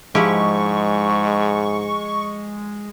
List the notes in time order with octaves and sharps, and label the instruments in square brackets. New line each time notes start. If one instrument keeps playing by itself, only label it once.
[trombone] G#2 [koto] F3 E4 G4 [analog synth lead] G#3 [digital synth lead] C#6